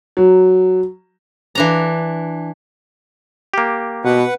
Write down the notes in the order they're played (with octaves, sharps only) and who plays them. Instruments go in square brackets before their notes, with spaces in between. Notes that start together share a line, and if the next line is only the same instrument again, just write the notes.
[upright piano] F#3
[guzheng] E3 D4 A#5
[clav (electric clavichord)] A#3 G4
[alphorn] B2 [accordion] B4 F#5